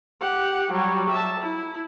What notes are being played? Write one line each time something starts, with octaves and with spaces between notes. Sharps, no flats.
G4 F#5
F#3 G3
E5 A5
E4